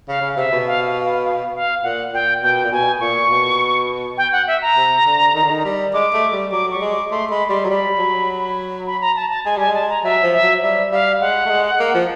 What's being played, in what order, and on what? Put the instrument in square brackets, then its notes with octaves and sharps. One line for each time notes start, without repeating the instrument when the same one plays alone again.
[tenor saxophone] C#3 [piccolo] F5
[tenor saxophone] C#3
[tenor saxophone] C3 [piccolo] E5
[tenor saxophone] B2
[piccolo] F5
F5
F5
F5
F5
[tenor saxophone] A#2 [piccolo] F#5
[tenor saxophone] A#2 [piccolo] G5
[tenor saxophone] B2 [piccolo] G5
[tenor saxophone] A#2
[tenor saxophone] B2 [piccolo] G#5
[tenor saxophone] A#2 [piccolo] C#6
[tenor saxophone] B2
[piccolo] G5
F#5
E5
A#5
[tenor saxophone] C3
D3
D#3
D3
D#3
G3
[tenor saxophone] G#3 [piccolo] D6
[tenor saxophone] A3
G3
[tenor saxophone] F#3 [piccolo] D6
[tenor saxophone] G3 [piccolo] C#6
[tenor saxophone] G#3
[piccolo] D6
[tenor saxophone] A3 [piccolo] C6
[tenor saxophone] G#3 [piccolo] B5
[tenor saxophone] G3 [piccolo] C6
[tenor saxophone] F#3
[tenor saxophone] G3 [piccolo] B5
[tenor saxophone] F#3
[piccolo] B5
A#5
A5
A5
[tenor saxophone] G#3 [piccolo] G#5
[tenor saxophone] G3 [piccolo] G#5
[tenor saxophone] G#3
[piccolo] A5
A#5
[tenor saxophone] F#3 [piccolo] E5
[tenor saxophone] F3
[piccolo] E5
[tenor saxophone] F#3
[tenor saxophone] G3 [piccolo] E5
[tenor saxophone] G3 [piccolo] F5
[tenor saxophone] G#3 [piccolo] F#5
[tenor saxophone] A3
G#3
A#3
F3